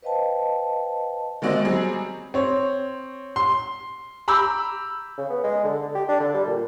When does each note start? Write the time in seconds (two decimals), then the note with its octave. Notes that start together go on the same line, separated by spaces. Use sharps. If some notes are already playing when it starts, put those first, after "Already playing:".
0.02 B4 C5 D#5 F5 G5 A5
1.42 D#3 G#3 C4 F#4 D5 D#5
1.65 F#3 G3 C4 G#4
2.34 C4 C#5
3.36 C6
4.28 A#5 B5 D6 E6 G6
5.18 C#3
5.30 B3
5.44 G#3
5.64 D3
5.83 D3
5.95 G4
6.09 D4
6.20 D3
6.34 G3
6.47 A#2